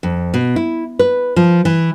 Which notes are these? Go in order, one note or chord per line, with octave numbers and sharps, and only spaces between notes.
F2
B2
E4
B4
F3
E3